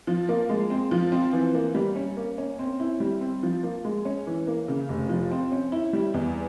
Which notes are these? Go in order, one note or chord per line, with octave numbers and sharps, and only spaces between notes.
F3
A#3
G#3
C4
F3
C4
E3
A#3
G3
C#4
A#3
C#4
C4
E4
G3
C4
F3
A#3
G#3
C#4
E3
A#3
C#3
F1
F3
C4
C#4
E4
G3
E2